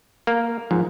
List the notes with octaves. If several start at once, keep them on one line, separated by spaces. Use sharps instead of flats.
A#3
G#2 F3